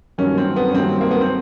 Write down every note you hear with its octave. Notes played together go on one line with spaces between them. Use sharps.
G2 D#3 F#3 A#3 C#4
C4
B3
C#4
G2 D#3 F#3 A#3 C4
A#3
B3
C4